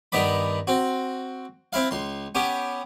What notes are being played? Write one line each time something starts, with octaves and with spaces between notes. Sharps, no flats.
G2 D#3 B3 D5 B5
C4 F#4
C4 E4 F5
C#2 C6
B3 C#4 G4